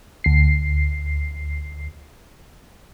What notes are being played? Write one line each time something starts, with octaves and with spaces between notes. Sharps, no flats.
D2 C7